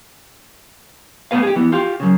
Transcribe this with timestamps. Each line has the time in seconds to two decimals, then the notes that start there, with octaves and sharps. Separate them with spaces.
1.31 A3 B3 C4 B4 F5
1.43 G4 G#4
1.56 E3 B3
1.72 F4 G4
2.00 F#2 C#3